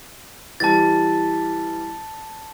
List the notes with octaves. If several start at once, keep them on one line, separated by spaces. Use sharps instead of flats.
E3 G3 A5 A6